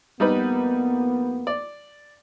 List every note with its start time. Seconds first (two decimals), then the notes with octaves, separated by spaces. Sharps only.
0.20 F2 G3 A#3 B3 D#4 B4
1.47 D5